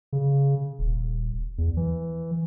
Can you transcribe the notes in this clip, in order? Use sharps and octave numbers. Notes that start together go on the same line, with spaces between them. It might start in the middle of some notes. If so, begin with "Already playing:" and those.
C#3
D#1
E2
E3